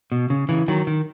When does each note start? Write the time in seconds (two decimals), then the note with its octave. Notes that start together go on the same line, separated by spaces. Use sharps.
0.12 B2
0.30 C#3
0.49 C#3 E3
0.68 D#3 F#3
0.87 D#3